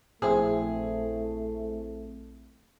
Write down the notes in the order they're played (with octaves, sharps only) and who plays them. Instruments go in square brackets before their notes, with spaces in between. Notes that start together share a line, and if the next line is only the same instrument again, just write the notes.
[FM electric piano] A#1 C4 E4 [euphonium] A3 [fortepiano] G#4